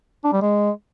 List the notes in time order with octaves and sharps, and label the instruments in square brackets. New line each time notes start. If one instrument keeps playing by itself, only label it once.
[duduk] D4
G3
G#3